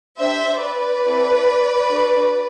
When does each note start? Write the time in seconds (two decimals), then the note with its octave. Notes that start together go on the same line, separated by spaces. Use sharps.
0.18 D4 G4 C5 E5
0.61 B4 D5
1.03 C4 E4 A4
1.88 D4 F#4 A4